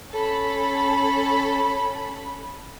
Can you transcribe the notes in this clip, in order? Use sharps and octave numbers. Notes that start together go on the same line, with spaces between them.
C#4 A4 B5